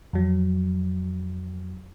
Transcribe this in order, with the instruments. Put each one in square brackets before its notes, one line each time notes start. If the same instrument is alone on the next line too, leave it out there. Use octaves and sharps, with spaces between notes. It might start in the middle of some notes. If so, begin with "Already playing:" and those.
[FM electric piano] F2 F#3